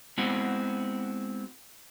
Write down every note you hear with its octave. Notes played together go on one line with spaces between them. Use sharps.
G#3 B3 C4 E4 F#4